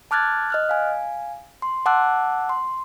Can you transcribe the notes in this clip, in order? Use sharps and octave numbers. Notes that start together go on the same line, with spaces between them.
A5 D6 F6 F#6 G#6 A6
D#5 F6 F#6
F5 G#5
C6
F#5 A5 D6 E6 F#6
C6